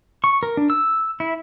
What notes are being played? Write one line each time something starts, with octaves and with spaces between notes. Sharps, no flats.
C#6
A#4
D4
E6
E4